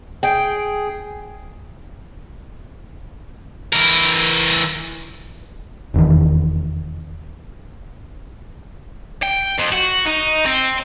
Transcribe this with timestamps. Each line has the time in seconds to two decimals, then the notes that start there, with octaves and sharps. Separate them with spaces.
0.23 G#4 G5
3.73 E3 A#4
5.94 F1 E2 D#3
9.23 G5
9.58 F2
9.72 F#4
10.05 D#4
10.46 C4